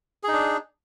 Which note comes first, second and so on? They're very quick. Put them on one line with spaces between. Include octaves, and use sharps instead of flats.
G#4 D#4 D4